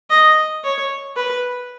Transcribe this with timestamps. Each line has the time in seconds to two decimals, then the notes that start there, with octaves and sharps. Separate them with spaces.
0.10 D#5
0.64 C#5
1.16 B4